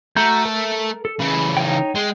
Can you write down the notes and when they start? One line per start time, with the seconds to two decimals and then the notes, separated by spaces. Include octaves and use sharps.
0.16 A3 F#4 A#5 G6
0.45 A4 A#4
1.05 A4
1.20 C#3 E3 B5
1.57 D#4 C#5 G5
1.95 G#3 G5